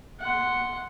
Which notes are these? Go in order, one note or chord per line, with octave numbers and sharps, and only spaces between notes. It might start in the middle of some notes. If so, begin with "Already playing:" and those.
F#5 C6